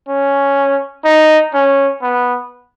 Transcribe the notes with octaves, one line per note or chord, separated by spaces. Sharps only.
C#4
D#4
C#4
B3